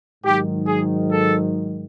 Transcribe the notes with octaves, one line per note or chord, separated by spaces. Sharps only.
G#2 D#3 F#3 G4
G#4
A4